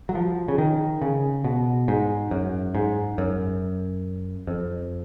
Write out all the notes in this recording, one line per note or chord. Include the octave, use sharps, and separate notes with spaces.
F#3
F3
C#3
D#3
C#3
B2
G#2
F#2
G#2
F#2
F2